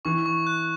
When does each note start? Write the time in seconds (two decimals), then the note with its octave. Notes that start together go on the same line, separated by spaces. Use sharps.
0.05 E3 C#6
0.26 C#6
0.47 F#6